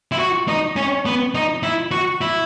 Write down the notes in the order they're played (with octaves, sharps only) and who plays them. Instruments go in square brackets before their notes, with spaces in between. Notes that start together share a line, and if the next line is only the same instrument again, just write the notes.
[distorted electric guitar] E4
F#4
D#4
C#4
B3
D#4
E4
F#4
E4